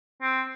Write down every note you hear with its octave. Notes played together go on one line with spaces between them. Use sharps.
C4